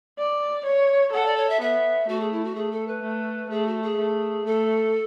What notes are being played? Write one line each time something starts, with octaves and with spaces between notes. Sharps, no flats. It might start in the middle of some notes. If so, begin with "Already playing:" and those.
D5
C#5
A4 F#5
D5
C#5
E5
B3 E5
A3 F#4
G#4
E4
F#4
A3 G#4
A4
B4
A3
A3 G#4
F#4
G#4
A3
A3 A4